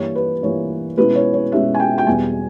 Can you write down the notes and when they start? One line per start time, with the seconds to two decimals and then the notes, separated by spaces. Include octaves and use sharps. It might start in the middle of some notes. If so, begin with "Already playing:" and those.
Already playing: G2 E3 A#3 C#5
0.15 B4
0.42 G2 E3 A#3 C#5
0.97 B2 G#3 C#4 E4 B4
1.16 C#5
1.34 C#5
1.52 B2 G#3 C#4 E4 E5
1.74 G#5
1.80 G5
1.98 G5
2.06 E2 B2 G3 G#5